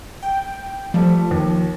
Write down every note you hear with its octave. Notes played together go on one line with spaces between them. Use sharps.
G5
F3 G3 A3
D#2